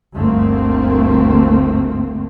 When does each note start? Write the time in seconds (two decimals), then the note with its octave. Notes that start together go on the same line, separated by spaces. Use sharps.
0.14 G1 D2 A3 A#3 C4